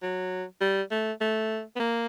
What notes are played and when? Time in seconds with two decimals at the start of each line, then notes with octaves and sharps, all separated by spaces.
0.02 F#3
0.61 G3
0.91 A3
1.21 A3
1.76 B3
1.80 A#3